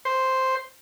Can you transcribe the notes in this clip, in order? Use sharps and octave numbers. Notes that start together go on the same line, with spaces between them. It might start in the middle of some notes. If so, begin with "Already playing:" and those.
C5